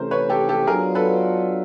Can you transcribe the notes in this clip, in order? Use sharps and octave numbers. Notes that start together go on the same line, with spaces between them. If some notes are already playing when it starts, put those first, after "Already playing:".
Already playing: C3 E3 A3 C#4 A#4 C5
B4 C#5
G4 A4
G4 A4
F#3 B3 D4 F4 G#4 A#4
A4 B4